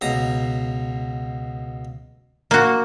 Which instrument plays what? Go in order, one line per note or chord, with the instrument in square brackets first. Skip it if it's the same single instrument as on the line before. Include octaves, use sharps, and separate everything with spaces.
[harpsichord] C#2 B2 A#5
[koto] A#3 F#4